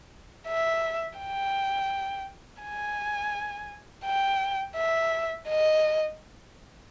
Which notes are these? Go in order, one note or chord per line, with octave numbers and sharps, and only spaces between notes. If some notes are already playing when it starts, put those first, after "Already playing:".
E5
G5
G#5
G5
E5
D#5